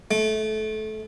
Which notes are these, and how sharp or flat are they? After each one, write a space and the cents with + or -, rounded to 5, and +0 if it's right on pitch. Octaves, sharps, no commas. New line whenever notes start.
A3 -25